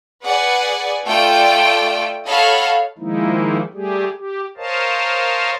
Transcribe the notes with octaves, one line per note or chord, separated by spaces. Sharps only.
G#4 B4 D5 F#5 G#5
A3 F4 A4 D5 G5
A4 C#5 D#5 F5 F#5 B5
D#3 F3 G#3 A#3 D#4 E4
G3 A3 G4 G#4
G4
A#4 C5 C#5 D#5 F5 A5